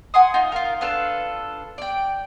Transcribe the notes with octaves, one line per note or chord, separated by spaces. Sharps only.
F#5 G#5 C6 D#6
D#4 F4
F4 A#4
D4 F4 A4 B4
D5 G5